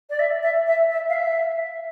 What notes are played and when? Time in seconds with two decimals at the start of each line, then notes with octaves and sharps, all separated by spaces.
0.10 D5
0.19 E5
0.42 E5
0.67 E5
0.90 E5
1.09 F5
1.13 E5